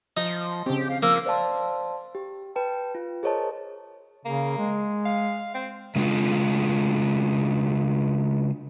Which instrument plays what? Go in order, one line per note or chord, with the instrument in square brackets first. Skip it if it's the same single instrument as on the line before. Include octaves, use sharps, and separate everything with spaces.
[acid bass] F3 [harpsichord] D#4
[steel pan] C#3 C4 [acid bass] G4
[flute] F5
[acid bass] F3 [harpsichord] A#3 [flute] E6
[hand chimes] C5 D5 F5 A5 C6
G4
B4 G5 A5
F4
G#4 A#4 C5 C#5 D#5 A5
[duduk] C#3 [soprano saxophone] A#3
[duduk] G#3
[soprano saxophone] F5
C4
[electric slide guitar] C#3 G#3 D4 F4